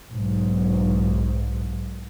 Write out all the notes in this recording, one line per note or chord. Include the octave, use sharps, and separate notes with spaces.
B1 G#2